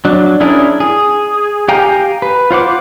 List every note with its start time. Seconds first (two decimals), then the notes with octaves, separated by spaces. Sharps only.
0.05 F#3 D4
0.40 C#4 D4 E4 G#4 A#4
0.80 G#4
1.68 G4 F5 G5 G#5 A#5
2.22 B4
2.51 F4 C5 F#5 D6